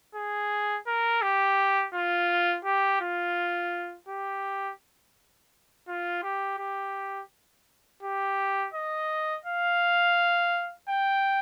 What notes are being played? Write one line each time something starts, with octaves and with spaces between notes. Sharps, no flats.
G#4
A#4
G4
F4
G4
F4
G4
F4
G4
G4
G4
D#5
F5
G5